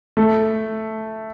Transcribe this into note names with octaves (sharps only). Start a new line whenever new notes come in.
A3